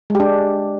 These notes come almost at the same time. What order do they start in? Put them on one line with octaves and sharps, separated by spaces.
G#3 G4 D4